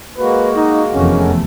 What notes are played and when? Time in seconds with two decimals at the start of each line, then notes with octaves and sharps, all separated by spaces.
0.18 G#3 A#3 F#4 B4
0.56 D#4
0.94 F1 E2 A3 C#4